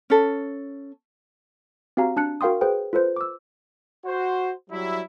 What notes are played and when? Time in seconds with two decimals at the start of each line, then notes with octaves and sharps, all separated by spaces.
0.10 C#4 A4
1.97 C4 F#4 G4 F5 G#5 A#5
2.17 D4 A5 F#6 C#7
2.41 F#4 A#4 F5 G5 C6 D#6
2.61 G#4 B4 C5 G5
2.93 F4 A4 B4 C5
3.16 D6 E6
4.06 F#4 C5
4.70 F#3 G3 E4